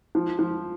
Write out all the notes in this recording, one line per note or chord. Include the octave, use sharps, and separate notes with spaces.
F3
F3